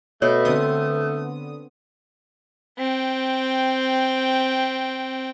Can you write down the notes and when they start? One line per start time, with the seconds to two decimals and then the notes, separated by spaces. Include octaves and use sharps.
0.22 B2 A3 C#5
0.45 D3 B3 C4 D#6
2.78 C4 G5